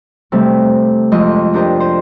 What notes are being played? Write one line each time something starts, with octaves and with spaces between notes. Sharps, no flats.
C3 G3 A3 C4
F2 G#3 D#5 C6
D4 G4 A#4 C5 D#5
C5